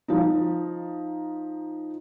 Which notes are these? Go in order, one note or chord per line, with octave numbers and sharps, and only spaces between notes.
F3 D#4